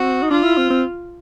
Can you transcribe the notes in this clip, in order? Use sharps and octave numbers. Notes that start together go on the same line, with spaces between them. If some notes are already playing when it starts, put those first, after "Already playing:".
Already playing: C4 F#4
D#4
D4 F4
E4
C4
C4